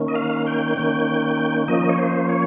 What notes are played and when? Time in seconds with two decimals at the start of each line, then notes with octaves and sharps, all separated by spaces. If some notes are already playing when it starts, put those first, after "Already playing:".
Already playing: D#3 A#3 C#4
0.08 D#5
0.15 F5
0.46 G5
0.77 D#3 A#3 C#4
1.68 F3 A#3 C#4 D#5
1.89 C#5
1.99 C5
2.29 C#5